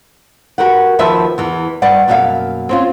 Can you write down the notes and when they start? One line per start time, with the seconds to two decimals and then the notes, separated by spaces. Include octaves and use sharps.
0.58 F#4 G4 A#4 B4 F#5
0.99 D#2 F3 F#4 B4 E5 A5
1.38 E2 E3
1.82 G2 G3 B4 D5 F#5
2.08 F#2 B2 A#3 E5 F5
2.69 C4 C#4 F4